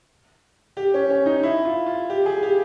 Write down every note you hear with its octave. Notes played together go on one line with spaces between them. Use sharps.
G4
C#4
C#4
D#4
E4
F4
F4
G4
G#4
G4